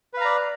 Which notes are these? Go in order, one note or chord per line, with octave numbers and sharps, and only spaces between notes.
B4 D5 F5 A#5